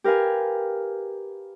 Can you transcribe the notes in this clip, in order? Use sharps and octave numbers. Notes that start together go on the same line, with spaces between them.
G4 A#4 B4 F5 G#5